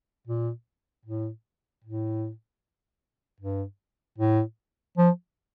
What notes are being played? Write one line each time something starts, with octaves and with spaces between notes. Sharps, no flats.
A#2
A2
A2
G2
A2
F3